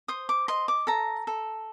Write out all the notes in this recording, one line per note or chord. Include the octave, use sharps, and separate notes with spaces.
C5 D#6
D6
D#5 C6
D6
A4 A#5
A4